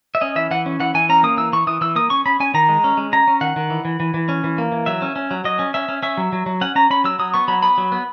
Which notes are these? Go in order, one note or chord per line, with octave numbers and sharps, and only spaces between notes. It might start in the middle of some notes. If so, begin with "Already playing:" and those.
E5
C#4 D#5
E3 E5
E3 F#5
C#4
E3 F#5
E3 G#5
C#4 A#5
A#3 D#6
E3 E6
E3 C#6
E3 D#6
E3 E6
A#3 D#6
C#4 C#6
C#4 B5
C#4 G#5
D#3 A#5
G#3
C#4
G#3
C#4 A#5
C#4
D#3 F#5
D#3
E3
E3
E3
E3
C#4
E3
A#3
E3
F#3 E5
C#4
C#4
F#3
F#3 D#5
C#4
C#4 E5
C#4
C#4 E5
F#3
F#3
F#3
C#4 F#5
C#4 A#5
C#4 B5
F#3 E6
F#3 D#6
B3 C#6
F#3 B5
B3 B5
F#3
B3